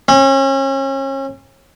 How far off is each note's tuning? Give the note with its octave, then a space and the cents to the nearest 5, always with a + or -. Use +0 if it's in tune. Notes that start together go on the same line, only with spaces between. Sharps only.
C#4 -35